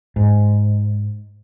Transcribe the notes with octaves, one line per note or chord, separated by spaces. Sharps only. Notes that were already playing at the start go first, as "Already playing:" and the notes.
G#2